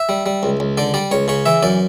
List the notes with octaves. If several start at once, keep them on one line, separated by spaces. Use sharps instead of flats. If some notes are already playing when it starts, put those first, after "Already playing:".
Already playing: E5
G3
G3
C#2
C#2
D3 D5
G3 D5
C#2 C#5
C#3 C#5
E3 E5
F#2 D5